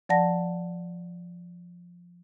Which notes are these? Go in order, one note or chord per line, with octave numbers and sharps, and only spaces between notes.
F3 D5 F#5 A5 A#6